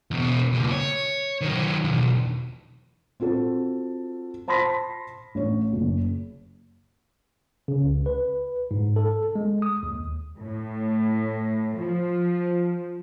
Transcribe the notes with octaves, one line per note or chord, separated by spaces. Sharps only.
E2 B2
C#2 A#2
C#5
D#3 F#3
B1 E2
C4 F4 F#4 A4
C5 A5 B5 C6 A#6 B6
A1 C#5
F#1
C#3
C#2
B4
G#2
A4
G#3
D#6
D#2
A2
F3